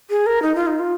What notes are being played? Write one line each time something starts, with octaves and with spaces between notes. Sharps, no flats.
G#4
A#4
D#4
F4
D#4
F4